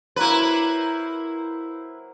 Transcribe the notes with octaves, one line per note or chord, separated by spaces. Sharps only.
F#3 A#3 E4 B4 C5